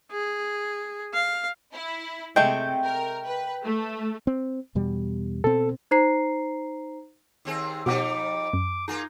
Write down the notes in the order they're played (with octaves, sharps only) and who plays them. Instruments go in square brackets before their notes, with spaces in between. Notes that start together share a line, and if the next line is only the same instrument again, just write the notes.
[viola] G#4
F5
[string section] E4
[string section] C3 [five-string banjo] G#3 A3 [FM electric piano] G5
[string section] A#4
B4
A3
[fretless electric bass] C4
E2 B2 G3
[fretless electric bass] B2 C4 [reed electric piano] A4
[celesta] D#4 C5 A#5 C7
[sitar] D#2 C4 G#4
[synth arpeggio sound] B2 B3 G4 [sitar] F3 G3 D#4 [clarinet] D6
[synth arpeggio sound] F#2
[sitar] A#3 F4 G#4 [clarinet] D#4